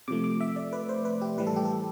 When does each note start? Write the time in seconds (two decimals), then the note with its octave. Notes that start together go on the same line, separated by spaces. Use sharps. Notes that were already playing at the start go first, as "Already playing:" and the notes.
0.08 C3 F3 A3 D6
0.24 D6
0.41 E5
0.56 D5
0.73 B4
0.89 C5
1.05 B4
1.22 G4
1.38 A2 E3 G3 B4
1.47 A4
1.56 G4
1.65 A4